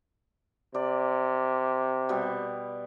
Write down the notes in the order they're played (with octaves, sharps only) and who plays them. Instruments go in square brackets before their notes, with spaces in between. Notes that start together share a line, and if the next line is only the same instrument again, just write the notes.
[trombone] C3 [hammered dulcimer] D5
[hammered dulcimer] B2 G3